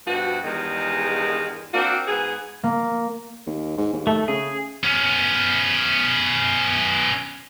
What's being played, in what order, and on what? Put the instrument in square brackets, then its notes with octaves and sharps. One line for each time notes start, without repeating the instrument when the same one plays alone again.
[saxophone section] G2 B2 F3 F#4
E2 G2 D#3 G#3
A#3 C4 D4 F#4
G#2 B3 G#4
[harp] A#3
[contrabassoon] D#2
G#2
D#2
[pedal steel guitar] A3
[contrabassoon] C#3 [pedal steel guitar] G#4
[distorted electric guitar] B3 C#4